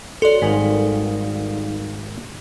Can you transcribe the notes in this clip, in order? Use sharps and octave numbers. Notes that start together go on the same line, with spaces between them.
F#4 A4 C#5 D5 C6
G#1 D#3 G3 D#4 F5 G#5